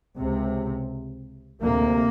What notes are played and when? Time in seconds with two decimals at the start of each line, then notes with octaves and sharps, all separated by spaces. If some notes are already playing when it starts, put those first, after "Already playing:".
0.17 C#2 C3
1.63 D2 C3 A#3